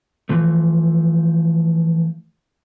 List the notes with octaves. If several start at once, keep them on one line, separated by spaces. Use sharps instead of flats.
E3 F3 A3